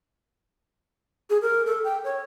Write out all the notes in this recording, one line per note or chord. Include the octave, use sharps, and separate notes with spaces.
G#4
A#4
A4
G5
C#5